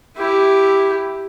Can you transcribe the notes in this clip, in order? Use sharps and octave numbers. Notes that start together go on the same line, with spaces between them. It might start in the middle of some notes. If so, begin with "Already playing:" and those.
E4 G4